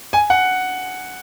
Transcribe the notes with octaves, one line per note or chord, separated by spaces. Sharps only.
G#5
F#5